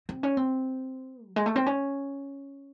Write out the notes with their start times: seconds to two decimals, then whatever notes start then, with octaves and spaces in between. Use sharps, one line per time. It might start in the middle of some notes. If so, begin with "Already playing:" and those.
0.09 C4
0.23 C#4
0.37 C4
1.26 F#3
1.36 G#3
1.46 A3
1.56 C4
1.66 C#4